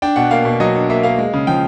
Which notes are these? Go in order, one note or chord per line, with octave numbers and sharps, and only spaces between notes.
D4 G5
B2 F#5
A#3 F5
B2
F#3 D#5
D4
A#3 E5
A#3 F5
G#3
C#3
F3 G5